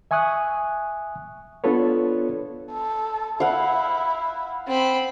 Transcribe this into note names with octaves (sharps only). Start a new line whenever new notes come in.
E5 G#5 C#6 D#6 F#6
B3 D4 F4 A4 B4 C#5
A4
E4 F5 F#5
C4 B5